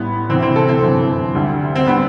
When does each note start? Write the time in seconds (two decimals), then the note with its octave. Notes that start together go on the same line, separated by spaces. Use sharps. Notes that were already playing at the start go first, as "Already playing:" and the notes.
Already playing: A1 A2 G3 B3
0.29 D2 C3 E3 C4
0.42 C4
0.56 A4
0.69 C4
0.81 G1 F#2 E3
1.35 D2 D3 G3
1.75 C4
1.87 D3 G3 B3